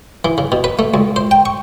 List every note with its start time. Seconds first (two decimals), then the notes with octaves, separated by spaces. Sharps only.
0.25 E3
0.38 C#3
0.52 B2
0.64 B4
0.79 A3
0.94 C#2
1.16 C5
1.31 G5
1.46 C#6